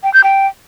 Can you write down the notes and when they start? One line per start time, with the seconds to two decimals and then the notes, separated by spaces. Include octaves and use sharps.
0.04 G5
0.14 G6
0.24 G5